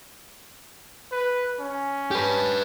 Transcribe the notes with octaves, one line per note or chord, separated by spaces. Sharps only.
B4
C#4
G4 B4